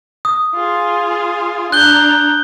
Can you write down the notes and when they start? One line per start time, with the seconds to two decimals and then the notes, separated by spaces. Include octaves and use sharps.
0.25 D#6
0.55 F4 G#4
1.72 D4 A#5 F#6 G6 G7